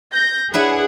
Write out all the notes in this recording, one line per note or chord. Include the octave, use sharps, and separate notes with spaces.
G6 A#6
D4 E4 G#4 B4 F#5